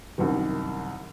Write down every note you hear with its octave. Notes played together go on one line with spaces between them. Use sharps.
C2 F#2 D#3